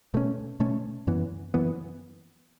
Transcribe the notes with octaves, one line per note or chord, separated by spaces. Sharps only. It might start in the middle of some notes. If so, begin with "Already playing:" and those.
B2 A3 C#4
B2 A3 C#4
F#2 E3 B3
F#2 E3 B3